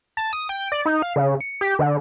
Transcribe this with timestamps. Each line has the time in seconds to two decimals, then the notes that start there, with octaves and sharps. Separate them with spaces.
0.17 A5
0.33 D#6
0.49 G5
0.72 D5
0.86 D#4
1.02 F5
1.16 C#3
1.41 C#7
1.61 G4
1.79 D3